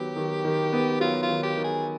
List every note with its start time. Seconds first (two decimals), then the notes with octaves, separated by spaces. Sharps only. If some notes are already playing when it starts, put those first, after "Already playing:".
Already playing: D#3 F#3 B3 G4
0.16 D#3
0.45 D#3
0.73 B3
1.00 F#3 F4
1.23 F4
1.29 D#3
1.43 G4
1.57 D#3
1.64 G#4